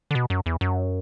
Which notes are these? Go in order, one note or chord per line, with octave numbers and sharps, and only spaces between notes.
D3
B2
F#2
E2
F#2